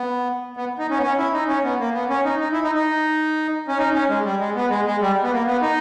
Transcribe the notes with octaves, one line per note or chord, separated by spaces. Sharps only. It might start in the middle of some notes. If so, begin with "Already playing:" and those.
Already playing: B3
B3
D#4
C#4
B3
C#4
E4
D#4
C#4
B3
A#3
B3
C#4
D#4
D#4
E4
D#4
D#4
C#4
D#4
C#4
G#3
G3
G#3
B3
G#3
G#3
G3
B3
A#3
B3
D#4